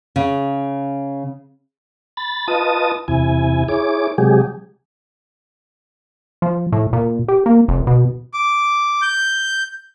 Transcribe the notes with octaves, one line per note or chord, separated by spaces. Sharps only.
C#3
B5 A6
F4 B4 D#5 A5 D#6
E2 C3 E4 G#5
E4 G#4 C#5 D6
C3 F#3 G#3 G4 G#4
F3
A2
A#2
G4
A#3
F1
B2
D6
G6